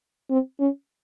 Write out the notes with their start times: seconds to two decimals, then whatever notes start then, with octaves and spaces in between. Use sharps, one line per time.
0.30 C4
0.60 C#4